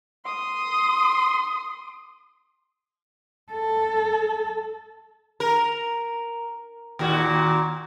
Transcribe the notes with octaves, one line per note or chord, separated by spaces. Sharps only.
C6 D#6
A4
A#4
D#2 A#2 F#4